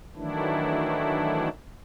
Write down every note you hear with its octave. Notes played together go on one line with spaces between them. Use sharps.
D#3 E3 F#3 A3 D4 E4